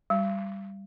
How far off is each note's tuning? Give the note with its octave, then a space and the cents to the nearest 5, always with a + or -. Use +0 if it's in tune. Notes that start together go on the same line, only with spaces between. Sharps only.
G3 +5